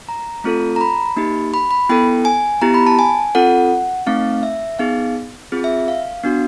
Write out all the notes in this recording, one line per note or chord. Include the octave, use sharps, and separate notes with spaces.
A#5
A3 C4 F4 A4
A#5
B5
A#3 D#4 G4
B5
B5
B3 E4 A4 G5
G#5
B3 E4 G4 A#5
B5
A5
G#5
C4 F4 A4 F#5
A3 C4 D#4 F5
E5
B3 D#4 G#4 F5
C4 F4 G#4
E5
F5
B3 D4 F#4